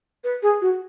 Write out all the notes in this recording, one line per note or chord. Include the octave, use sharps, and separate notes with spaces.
B4
G#4
F#4